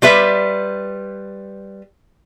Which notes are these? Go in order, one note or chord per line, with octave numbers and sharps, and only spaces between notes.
G3 F4 B4 E5